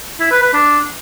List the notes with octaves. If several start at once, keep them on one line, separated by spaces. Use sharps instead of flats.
E4
B4
B4
D4